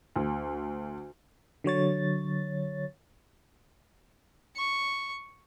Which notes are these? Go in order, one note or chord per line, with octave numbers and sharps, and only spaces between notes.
D2
D3 F#3 C#5 A6
C#6